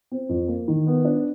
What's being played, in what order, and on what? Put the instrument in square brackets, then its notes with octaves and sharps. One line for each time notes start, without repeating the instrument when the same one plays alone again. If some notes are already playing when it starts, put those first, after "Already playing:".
[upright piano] C4
F2
A#3
D#3
B3
D4